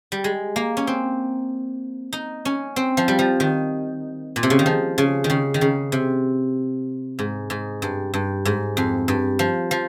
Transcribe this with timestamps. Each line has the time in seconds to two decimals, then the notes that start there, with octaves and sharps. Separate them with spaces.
0.12 G3
0.24 G#3
0.56 A#3
0.77 C#4
0.87 C4
2.13 D#4
2.45 C#4
2.76 C4
2.97 F3
3.08 G3
3.19 F3
3.40 D#3
4.36 A#2
4.43 C3
4.50 C#3
4.59 D#3
4.66 F3
4.98 C#3
5.24 D#3
5.30 C#3
5.54 D#3
5.61 C#3
5.92 C3
7.19 G#2
7.50 G#2
7.82 G2
8.14 G2
8.45 G#2
8.77 F2
9.08 G2
9.39 F3
9.71 F3